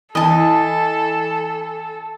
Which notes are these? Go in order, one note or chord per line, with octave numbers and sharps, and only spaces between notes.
E3 A4 D#5 A5